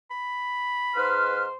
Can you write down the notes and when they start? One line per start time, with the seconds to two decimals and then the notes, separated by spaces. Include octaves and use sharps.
0.11 B5
0.95 G#2 B4 C5 F6